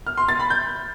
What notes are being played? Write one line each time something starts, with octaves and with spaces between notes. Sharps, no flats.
F6
C6
A6
B5
G6